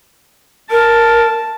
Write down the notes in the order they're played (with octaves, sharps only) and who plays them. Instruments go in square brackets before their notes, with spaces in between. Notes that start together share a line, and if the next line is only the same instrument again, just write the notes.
[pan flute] A#4 [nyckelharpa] A5